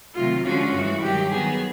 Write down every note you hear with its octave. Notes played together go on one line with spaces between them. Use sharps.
C3 D#3 F#3 A3 F4
D3 F3 G#3 C#4 F4 F#4
G2 E3 G#3
G2 D#3 F#3 G4
D#3 F#3 B3 G#4